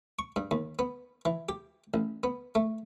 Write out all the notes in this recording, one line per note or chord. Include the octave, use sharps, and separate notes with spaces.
C#6
G2
D#2
B3
E3
G4
A1
B3
A3